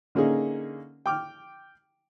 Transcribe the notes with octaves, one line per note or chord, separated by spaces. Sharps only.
D3 A#3 C#4 D#4 G#4
G5 D6 F6